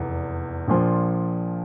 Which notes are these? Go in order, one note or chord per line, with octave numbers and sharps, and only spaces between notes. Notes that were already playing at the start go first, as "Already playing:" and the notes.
Already playing: F1 E2
A#1 A#2 F3